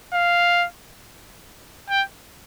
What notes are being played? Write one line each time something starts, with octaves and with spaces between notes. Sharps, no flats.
F5
G5